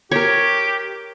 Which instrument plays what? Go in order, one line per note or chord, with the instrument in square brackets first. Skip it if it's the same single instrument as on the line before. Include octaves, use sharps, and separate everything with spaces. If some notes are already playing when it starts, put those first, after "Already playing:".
[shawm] G4 [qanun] A#4 C#5